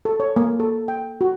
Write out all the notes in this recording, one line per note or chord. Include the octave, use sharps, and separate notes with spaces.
A4
C#5
A#3
A4
G5
F#4